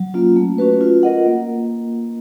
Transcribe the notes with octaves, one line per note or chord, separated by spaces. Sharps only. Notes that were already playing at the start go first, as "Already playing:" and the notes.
Already playing: F#3
A#3 C#4 F4
A3
C#4 F#4 B4
F4
A#4 D#5 F#5
A#3